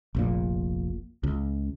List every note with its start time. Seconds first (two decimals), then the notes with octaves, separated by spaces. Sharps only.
0.15 F1 A#1 A#2
1.23 C#2